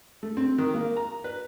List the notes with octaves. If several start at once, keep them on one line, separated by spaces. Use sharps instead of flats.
A3
C4
D#3
A#3
A#5
B4